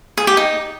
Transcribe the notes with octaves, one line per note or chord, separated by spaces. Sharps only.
G#4
G4
D#4